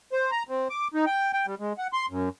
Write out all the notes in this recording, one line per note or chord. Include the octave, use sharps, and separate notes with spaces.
C5
A#5
C4
D6
D#4
G5
G5
G3
G#3
F#5
C6
F#2